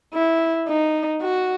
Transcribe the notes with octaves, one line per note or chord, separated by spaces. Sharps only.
E4
D#4
F#4